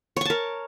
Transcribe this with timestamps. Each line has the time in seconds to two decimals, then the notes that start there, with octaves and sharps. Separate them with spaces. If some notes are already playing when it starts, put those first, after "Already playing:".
0.16 C#5
0.21 C#6
0.25 A5
0.30 A#4